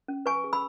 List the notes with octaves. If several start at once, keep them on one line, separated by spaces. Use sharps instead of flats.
C#4
B4 G#5 C#6
G#4
B5 E6